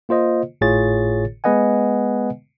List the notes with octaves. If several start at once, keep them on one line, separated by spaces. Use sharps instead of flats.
A#3 F4 C5 D#5
G#1 A2 F4 G#4 C#5 A6
G#3 B3 B4 D#5 F#5 G#5